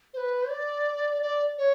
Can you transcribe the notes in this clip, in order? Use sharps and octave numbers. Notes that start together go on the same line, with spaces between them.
C5
B4
D5
D5
C#5